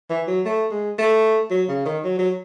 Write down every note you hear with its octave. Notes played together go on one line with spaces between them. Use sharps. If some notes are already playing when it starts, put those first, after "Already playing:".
E3
F#3
A3
G#3
A3
F#3
C#3
D#3
F#3
F#3